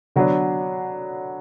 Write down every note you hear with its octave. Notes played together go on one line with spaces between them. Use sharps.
D3 F#3 B3 D4